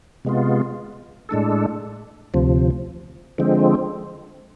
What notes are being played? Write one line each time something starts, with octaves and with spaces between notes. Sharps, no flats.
C3 G#3 B3 F4
A2 G#3 D4 A4
D2 C3 F3
D3 F3 G#3 C4